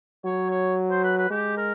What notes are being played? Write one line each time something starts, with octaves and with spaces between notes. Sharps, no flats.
F#3 C#5
C#5
C5
B4
B4
G#3 G4
A#4